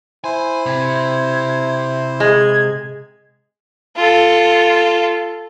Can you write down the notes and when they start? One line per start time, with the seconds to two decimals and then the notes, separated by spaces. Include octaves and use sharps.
0.24 E4 C5 G#5
0.66 C3 G#6
2.20 G#3 G#6
3.97 F4 A4